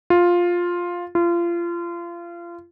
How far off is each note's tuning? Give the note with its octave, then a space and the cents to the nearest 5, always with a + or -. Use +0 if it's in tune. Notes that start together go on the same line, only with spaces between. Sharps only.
F4 +5
F4 -30